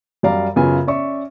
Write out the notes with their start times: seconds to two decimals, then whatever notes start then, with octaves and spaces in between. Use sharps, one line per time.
0.23 F#2 G3 D5 F5 A#5
0.56 F#2 C#3 B3 F4 G#5
0.87 C#4 D5 E5 C#6